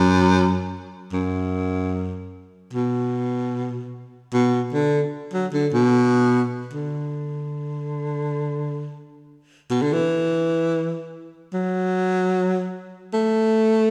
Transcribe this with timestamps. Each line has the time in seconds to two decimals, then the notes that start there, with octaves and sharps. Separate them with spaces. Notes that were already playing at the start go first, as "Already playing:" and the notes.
Already playing: F#2
1.13 F#2
2.73 B2
4.33 B2
4.73 D3
5.33 F#3
5.53 D3
5.73 B2
6.73 D3
9.70 B2
9.82 D3
9.93 E3
11.53 F#3
13.13 A3